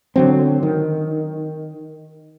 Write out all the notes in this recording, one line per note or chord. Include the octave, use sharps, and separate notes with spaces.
D3 F#3 C4
D#3